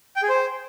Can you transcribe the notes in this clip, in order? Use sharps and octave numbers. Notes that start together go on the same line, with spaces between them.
G5
G#4
C5